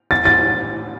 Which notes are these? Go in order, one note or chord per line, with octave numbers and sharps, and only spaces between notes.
A6
A6